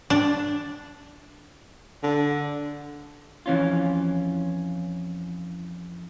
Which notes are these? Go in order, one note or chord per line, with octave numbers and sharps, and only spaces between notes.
D4
D3
F2 E3 C#4 F4